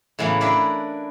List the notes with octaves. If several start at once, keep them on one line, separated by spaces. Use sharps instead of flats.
A2 C#3 E3 F#3 A#3 B3
D4 E4 A#4 B4 D5